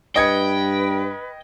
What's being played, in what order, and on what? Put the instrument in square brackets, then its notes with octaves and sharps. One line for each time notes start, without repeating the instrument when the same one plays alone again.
[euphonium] G2 [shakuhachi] B4 [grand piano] D#5 G#6 C#7 [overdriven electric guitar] G5